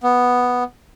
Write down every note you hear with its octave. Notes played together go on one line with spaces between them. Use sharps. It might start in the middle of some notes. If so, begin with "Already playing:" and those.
B3